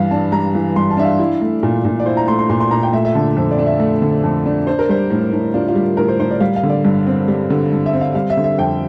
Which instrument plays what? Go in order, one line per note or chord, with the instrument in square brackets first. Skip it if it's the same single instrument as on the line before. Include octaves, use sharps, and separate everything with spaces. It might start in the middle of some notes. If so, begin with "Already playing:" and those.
Already playing: [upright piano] G2 E3 G3 F5
D4 A5
G3 A#5
E3
G2 C6
A5
D4 E5
F5
E4
A3
A#2
A#2
D5
E4 C5
A#5
A3 C6
C6
A#2 C6
C6
A#2 A#5
G5
A3 E5
E5
D3 A5
F2 A4
D5
D4
E5
A3
D3
F2
D4
D4 C5
A#4
G3 C5
A2
A2
D4 F4
F4
G3
A2 A#4
C5
A2 C5
D5
G3 F5
F5
D3
D5
G2
C4
G3
D3
G2
E5
C4
F5
G3 F5
E5
D3
E5
F2 G5